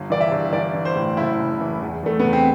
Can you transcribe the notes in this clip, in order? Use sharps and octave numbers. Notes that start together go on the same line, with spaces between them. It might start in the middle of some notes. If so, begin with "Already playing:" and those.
Already playing: G1
E3 D5
E5
G1
E3 D5
E3
C5
A2
F#1 E4
F#1
E3
E2
E2 A3
E2 B3
C4